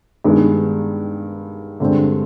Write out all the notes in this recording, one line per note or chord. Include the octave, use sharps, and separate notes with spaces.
G2 D#3 G#3 B3
G2 D3 G#3 C4